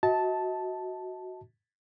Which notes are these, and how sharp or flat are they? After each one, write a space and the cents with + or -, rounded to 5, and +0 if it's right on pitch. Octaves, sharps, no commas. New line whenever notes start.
F#4 +0 D#5 +40 A5 -5